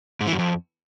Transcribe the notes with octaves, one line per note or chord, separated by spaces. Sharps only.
G#2
E3
F#2
F2